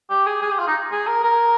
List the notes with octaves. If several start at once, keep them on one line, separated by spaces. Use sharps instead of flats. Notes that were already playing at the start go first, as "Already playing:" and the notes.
G4
G#4
G#4
G4
F4
D#4
G#4
A#4
A#4